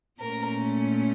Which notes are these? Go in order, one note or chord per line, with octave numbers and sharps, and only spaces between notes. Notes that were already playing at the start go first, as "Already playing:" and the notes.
A#2 A3 C#4 A#4